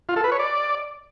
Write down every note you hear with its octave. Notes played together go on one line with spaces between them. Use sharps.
F4
A4
B4
C#5
D5